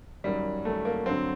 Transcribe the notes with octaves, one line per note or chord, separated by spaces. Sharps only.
F#2 D#3 F#3 G3
F#2 D#3 F#3 A3
A#3
G2 D3 F#3 C4